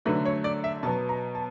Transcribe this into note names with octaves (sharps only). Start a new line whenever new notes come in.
D3 F#3 A3 B4
C#5
D5
E5
B2 F#3 B3 A5
A#5
A5